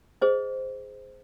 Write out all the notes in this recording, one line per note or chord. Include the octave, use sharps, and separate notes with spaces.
G#4 C5 D#5